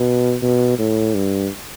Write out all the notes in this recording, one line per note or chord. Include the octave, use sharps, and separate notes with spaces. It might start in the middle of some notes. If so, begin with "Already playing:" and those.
Already playing: B2
B2
A2
G2